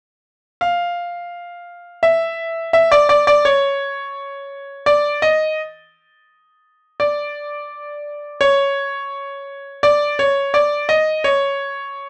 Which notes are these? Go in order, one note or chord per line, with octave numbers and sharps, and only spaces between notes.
F5
E5
E5
D5
D5
D5
C#5
D5
D#5
D5
C#5
D5
C#5
D5
D#5
C#5